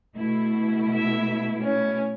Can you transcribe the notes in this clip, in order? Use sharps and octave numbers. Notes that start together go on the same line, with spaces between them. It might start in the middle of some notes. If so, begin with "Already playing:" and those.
B2 A3 E4
E5
C#4